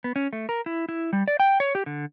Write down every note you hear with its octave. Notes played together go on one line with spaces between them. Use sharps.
B3
C#4
A3
A#4
E4
E4
G3
D5
G5
C#5
G4
D3